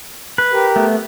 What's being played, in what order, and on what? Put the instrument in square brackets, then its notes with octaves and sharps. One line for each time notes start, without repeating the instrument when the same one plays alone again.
[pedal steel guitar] B4
[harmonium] G4 A#4
[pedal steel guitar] A3 B3